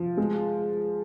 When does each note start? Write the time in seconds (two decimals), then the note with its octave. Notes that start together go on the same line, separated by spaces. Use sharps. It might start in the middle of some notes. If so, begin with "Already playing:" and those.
Already playing: F3
0.17 G#3